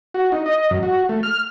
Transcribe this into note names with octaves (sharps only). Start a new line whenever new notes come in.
F#4
D#4
D#5
F#2
F#4
A3
F6